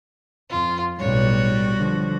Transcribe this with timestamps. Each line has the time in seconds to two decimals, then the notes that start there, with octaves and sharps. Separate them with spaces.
0.50 F2 F4
0.99 B1 A2 G3 F#4 C#5
1.76 D3 F3